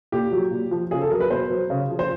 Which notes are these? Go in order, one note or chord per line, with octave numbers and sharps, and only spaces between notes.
A#2 G4
F#3
A#2
F3
C#3 G#4
A4
F#3 A#4
B4
B2 C5
F#3
C#3
F3
C5